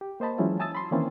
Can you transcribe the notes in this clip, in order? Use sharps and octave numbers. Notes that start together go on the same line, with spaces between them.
G4
A#3 C5 D#5 A5 B5
E3 F#3 G#3 C#4 E4 F4
G#5 A5 D#6 E6 A6
B5 C6
D#3 E3 A#3 C4 C#4 E4